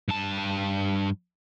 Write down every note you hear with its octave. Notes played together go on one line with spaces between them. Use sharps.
G2 A5